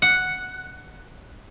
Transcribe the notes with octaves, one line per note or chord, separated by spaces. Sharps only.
F#5